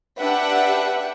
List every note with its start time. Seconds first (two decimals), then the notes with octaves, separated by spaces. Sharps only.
0.19 D4 G4 B4 E5 F#5 G5